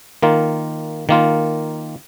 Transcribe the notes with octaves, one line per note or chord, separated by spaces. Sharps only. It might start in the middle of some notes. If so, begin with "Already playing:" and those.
D#3 A#3 F4
D#3 A#3 F4